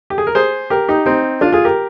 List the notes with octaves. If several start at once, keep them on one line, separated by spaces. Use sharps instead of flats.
G4
G#4
A#4
G#4 C5
G4 A#4
D#4 G4
C4 D#4
D4 F4
F4 G#4
G4 A#4